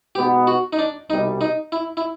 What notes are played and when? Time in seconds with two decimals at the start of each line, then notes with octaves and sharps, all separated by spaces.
0.15 B2 G#3 B3 D#4 G4
0.47 F#4
0.73 D#4
0.79 D4
1.10 C2 B2 G3 D#4
1.41 D#4
1.72 E4
1.97 E4